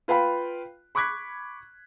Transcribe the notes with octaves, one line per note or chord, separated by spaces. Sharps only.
F4 B4 F5 G5 B5
B5 C#6 D6 F#6 G#6 B6